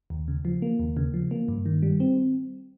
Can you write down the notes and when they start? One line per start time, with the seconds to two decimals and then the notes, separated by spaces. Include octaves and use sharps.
0.10 D#2
0.28 C#3
0.45 F3
0.62 A#3
0.79 D#2
0.97 C#3
1.14 F3
1.31 A#3
1.48 G2
1.66 D#3
1.82 G3
2.00 C4